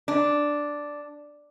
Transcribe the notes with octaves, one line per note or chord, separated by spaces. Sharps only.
D4